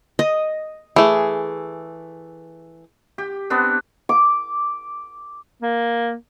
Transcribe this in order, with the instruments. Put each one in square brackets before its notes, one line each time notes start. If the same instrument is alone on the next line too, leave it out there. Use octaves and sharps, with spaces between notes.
[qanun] D#5
[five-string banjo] E3 A3 [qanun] G#4
[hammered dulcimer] G4
B3 C4 D4
[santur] D6
[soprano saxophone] A#3